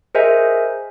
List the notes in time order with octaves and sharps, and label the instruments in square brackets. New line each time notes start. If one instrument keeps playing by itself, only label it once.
[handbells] G#4 A#4 C5 D#5 E5 G#5